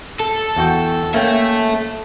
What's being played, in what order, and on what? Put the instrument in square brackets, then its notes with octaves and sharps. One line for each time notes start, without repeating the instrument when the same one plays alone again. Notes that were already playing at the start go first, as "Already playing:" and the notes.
[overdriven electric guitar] A4
[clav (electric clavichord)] E2 F#4 G5
[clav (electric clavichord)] A#3 C#4 G5 [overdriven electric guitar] A4 E5